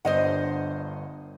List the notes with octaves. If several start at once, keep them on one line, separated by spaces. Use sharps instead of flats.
G1 G2 C5 D#5 F#5